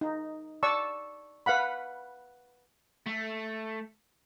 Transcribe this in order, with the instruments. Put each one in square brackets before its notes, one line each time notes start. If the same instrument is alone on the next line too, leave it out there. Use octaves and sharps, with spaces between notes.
[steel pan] D#4
D5 A5 C#6 E6
B4 F5 F#5 B5
[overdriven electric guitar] A3